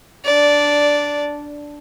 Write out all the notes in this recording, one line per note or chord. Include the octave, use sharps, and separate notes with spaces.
D4 D5